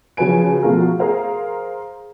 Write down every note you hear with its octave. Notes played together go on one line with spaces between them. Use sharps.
C#3 F3 F#3 B4 G#5 D7
B2 F3 A3 F4 G#4 A#4
F#4
G#4 A#4 C5 F5